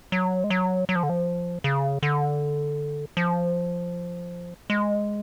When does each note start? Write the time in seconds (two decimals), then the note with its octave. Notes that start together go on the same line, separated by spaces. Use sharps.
0.12 F#3
0.44 G#3
0.50 F#3
0.89 F#3
0.96 F3
1.03 D3
1.10 F3
1.64 C#3
2.03 D3
3.17 F3
4.70 G#3